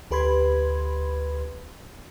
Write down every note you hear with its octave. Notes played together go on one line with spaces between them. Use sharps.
D2 G4 B4 B5 C6 G#6